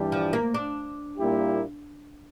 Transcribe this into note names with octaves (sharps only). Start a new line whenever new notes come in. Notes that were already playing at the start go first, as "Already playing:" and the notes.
Already playing: G2 E3 G3 D4 G4
F3
A#3
D4
A#2 G3 A#3 E4 G4